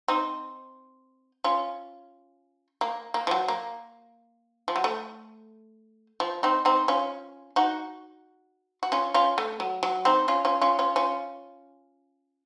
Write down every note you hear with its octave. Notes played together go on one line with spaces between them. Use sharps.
C4 D#4
C#4 F4
A#3
A#3
F3
F#3
A#3
F3
F#3
A3
F3
C4 D#4
C4 D#4
C#4 F4
D#4 F#4
F#4
C#4 F4
C#4 F4
A3
F#3
F#3
C4 D#4
C#4 F4
C#4 F4
C#4 F4
C#4 F4
C#4 F4